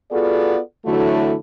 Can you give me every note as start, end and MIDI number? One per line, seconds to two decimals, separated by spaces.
0.11 0.58 59
0.11 0.58 65
0.11 0.58 66
0.11 0.58 68
0.11 0.58 69
0.11 0.58 74
0.85 1.34 40
0.85 1.34 50
0.85 1.34 54
0.85 1.34 57
0.85 1.34 64
0.85 1.34 66